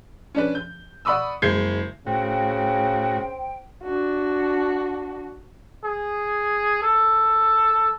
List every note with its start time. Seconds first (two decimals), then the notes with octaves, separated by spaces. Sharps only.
0.35 C#4 D4 B4
0.55 G6
1.05 D5 F#5 B5 C#6 D#6 E6
1.42 F#1 G#3 G6 G#6 C7
2.07 A2 C#3 C4 F#4 G5
3.83 D4 F#4
5.84 G#4
6.83 A4